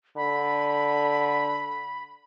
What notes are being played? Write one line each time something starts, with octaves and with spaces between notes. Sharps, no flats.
D3 B5